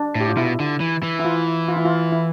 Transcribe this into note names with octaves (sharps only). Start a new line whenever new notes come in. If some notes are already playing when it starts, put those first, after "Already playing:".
Already playing: D4
A2
G4
F4
B2 E4
D3
E3
E3
E4
F4
F4
E4
F4
E4